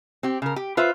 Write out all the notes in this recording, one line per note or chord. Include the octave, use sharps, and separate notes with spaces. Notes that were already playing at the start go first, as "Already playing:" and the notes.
C4 G4
C#3 A#4
G4
F4 B4 C5 E5